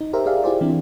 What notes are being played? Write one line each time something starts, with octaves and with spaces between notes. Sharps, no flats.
D#4
G4 A#4 C5 E5
G4 G#4 D5 E5 F5
E4 F4 G4 G#4 C5 D5
E3 C4 D4 E4